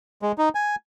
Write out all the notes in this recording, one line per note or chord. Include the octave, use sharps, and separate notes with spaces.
G#3
D#4
G#5